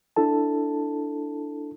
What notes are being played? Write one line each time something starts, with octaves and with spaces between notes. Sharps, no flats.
D4 E4 A4 A5